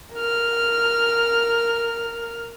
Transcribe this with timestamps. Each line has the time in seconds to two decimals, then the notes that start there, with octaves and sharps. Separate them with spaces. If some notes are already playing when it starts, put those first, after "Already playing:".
0.14 A#4 F6